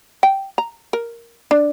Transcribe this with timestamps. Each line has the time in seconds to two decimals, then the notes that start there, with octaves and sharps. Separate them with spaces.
0.23 G5
0.58 A#5
0.93 A#4
1.51 D4